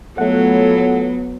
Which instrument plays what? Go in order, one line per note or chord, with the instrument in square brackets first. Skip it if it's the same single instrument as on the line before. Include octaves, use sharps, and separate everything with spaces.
[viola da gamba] F#3 [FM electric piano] A3 F#5 [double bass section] B3 [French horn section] F4 A4 C#5